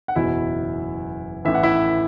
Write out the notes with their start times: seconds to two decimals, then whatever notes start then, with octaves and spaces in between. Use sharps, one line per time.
0.08 F#5
0.15 F#1 E2 B2 F#3 E4 E5
1.45 A1 A2 E3 E5
1.55 F#5
1.63 E4 E5